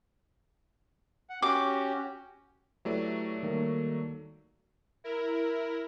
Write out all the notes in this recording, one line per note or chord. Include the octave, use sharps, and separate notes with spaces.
F#5
C#4 F#4 G4 D6
F#3 A3 E4 G4 B4 D5
D#3 G3 A#3
E4 A#4